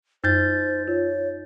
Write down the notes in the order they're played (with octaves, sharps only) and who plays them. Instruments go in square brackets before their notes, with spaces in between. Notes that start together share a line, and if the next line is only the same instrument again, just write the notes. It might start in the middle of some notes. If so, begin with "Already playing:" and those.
[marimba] F#2 [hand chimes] D#4 G6 A6 [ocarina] C5
[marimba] F4 [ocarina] C#5